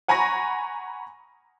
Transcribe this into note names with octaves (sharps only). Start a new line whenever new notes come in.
F#5 G#5 A#5 B5 C#6 A#6